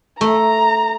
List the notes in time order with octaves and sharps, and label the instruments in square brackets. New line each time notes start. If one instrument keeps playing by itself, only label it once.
[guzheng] A3 [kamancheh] A#5